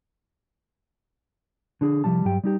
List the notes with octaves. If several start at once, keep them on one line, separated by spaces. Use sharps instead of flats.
D3 D4 G#4
C2 E3 F3 G3 A5
G2 F#3 G4 G5
G3 D#4 G4